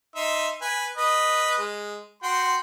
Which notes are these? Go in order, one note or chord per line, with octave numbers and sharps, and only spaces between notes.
D#4 E5 C6
B4 G#5
B4 D#5
G#3
F#4 G5 C6